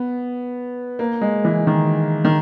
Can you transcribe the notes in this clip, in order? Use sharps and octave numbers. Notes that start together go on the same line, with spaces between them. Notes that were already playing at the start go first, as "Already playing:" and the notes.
Already playing: B3
A#3
G#3
E3
D#3
D#3